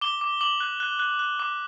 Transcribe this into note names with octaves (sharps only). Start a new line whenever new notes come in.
D6 G7
D6
D6 F#7
F#6
F#6
F#6
F#6
D6